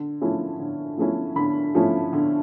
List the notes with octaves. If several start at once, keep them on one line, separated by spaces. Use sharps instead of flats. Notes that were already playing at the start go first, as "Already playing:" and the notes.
Already playing: D3
F3 A3 C#4 E4
D3
F3 A3 C#4 E4
D3 B5
F3 A3 C#4 E4
D3